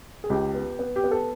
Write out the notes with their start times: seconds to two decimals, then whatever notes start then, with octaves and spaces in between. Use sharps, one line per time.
0.24 G#4
0.30 C#2 G4
0.54 B3
0.79 B3
0.96 G4
1.04 B3
1.11 A4